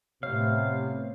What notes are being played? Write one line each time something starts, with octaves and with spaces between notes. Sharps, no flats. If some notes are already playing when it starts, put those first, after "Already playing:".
A2 C3 B3 C#5 F5